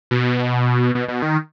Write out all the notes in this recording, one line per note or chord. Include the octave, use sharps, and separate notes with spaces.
B2
B2
B2
D#3